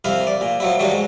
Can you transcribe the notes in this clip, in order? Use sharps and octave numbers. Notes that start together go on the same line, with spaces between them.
C2 F2 E4 F5
D5
A#2
F3 F#3 E4
D#3 F#3 G3 D4
G#2